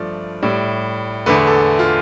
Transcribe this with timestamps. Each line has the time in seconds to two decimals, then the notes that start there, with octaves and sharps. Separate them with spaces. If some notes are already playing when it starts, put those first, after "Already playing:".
Already playing: G2 F3 A3 D5
0.42 A2 G3
1.26 E2 D3 A3 B4
1.47 A4
1.79 F4